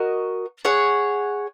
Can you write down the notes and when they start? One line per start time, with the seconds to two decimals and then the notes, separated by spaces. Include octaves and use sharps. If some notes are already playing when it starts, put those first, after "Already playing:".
Already playing: F#4 A#4 D#5
0.65 G#4 C#5 F#5